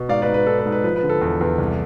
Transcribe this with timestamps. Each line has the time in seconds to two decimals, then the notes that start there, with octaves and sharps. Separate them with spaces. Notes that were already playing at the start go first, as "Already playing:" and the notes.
Already playing: B2
0.09 G#2 D5 F5
0.22 B4 D5
0.28 G#2
0.34 B4
0.47 G#2 A4
0.59 B4
0.65 G#2
0.72 B4
0.84 F3 B4
0.96 B4
1.03 D3
1.09 A4
1.21 E2
1.41 E2
1.58 C2